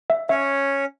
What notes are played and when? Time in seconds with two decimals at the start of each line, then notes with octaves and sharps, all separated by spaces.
0.10 E5
0.29 C#4 C#5 E5